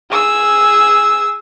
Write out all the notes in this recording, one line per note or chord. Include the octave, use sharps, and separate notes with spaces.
G#4 E6